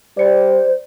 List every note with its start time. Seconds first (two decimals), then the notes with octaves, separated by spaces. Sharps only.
0.17 G3 C5 D5 C#7